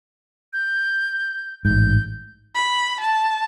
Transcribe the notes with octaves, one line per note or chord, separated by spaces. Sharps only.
G6
A1 G#2 G6
B5
A5